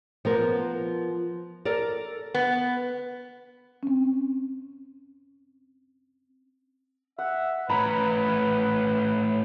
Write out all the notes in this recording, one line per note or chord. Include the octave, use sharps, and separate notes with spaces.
F3 B3 A#4
A4 A#4 D5
B3
C4 C#4
E5 F#5
A2 C#4 B4 A#5 B5